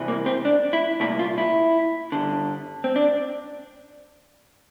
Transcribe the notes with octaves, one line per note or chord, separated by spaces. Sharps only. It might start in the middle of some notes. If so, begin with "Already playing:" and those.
Already playing: C2 C3 E3
A#3
C4
D4
E4
C2 A#2 E4
F4
E4
G2 D3
C4
D4